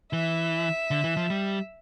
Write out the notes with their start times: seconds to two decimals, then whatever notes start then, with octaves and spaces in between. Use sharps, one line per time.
0.12 E3 E5
0.91 D3
1.04 E3
1.17 F3
1.30 G3